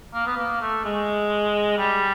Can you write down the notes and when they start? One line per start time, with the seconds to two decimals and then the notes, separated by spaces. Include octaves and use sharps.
0.14 A#3
0.26 B3
0.37 A#3
0.61 A3
0.84 G#3
1.78 G3